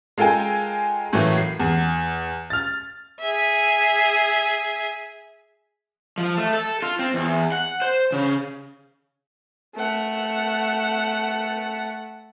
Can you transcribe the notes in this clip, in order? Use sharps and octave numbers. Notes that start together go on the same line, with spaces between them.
G#3 F4 A4 A#4 G5 G#5
A2 E3 F#3 A3 A#3
C7
E2
F6 A6
G#4 E5
F3
A3
A4
F4
C4
E2
F#5
C5
C#3
A3 F#5